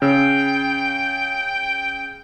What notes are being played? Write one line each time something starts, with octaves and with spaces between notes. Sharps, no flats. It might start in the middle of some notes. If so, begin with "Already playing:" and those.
C#3 G5 E6